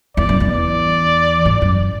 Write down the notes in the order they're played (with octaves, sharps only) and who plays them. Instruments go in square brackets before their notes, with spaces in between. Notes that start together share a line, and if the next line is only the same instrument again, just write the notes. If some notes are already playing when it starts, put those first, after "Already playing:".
[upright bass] E2 [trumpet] D5
[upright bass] F#2
E2
[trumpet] D5
[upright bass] G#2
F#2